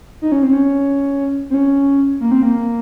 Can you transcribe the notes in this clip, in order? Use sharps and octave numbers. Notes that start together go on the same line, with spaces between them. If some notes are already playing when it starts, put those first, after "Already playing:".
D#4
C#4
C4
C#4
C4
C#4
A#3
C4
A#3